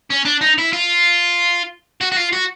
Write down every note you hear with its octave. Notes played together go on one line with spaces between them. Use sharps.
C#4
D4
D#4
E4
F4
F#4
F#4
F4
F#4